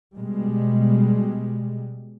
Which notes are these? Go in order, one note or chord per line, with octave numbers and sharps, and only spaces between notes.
B2 G3 G#3